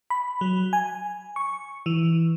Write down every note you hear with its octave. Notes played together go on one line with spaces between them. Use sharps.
B5
F#3
G#5
C#6
E3